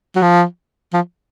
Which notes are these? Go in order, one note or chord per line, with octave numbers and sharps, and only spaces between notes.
F#3
F3
F3